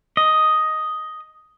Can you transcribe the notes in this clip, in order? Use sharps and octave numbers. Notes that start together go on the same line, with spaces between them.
D#5